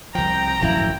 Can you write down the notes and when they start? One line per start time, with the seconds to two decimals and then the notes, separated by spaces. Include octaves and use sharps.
0.15 C2 F3 G5 A#5
0.61 D1 G#1 F#2 F3 E4 E5